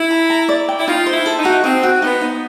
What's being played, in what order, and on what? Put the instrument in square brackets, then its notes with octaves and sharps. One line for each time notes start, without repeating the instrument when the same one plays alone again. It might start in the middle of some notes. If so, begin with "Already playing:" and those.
Already playing: [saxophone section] E4
[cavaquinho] A#5
A#5
D5
G5
[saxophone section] E4
[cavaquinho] D#4 [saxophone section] F4
[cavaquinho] C5
[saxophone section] E4
[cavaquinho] A4
[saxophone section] D#4
[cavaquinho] F#4
[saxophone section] C4 [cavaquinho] D#4
[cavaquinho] F#4
[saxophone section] B3 [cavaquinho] D#4
[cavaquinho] D#4